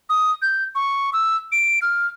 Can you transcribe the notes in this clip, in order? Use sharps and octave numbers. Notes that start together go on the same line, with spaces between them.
D#6
G6
C#6
E6
D7
F6